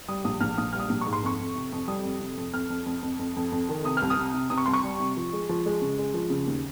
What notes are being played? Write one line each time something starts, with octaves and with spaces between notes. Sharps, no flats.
G3 D#6
A#1 D#6
A#1 F6
A#1 D#6
G3 F6
D#6
A#1
G#2 C#6
C6
F2 C#6
F2
C3
F2
G3 D#6
F2
C3
F2
F2 F6
F2
F2
F2
F2
F2
F2
D#3
C3 D#6
C2 F6
D#6
C3
C3
C3 D#6
C#6
C2 C6
C#6
G3
C3
F3
G#3
F3
G#3
C#3
G#3
F3
C#3
D#2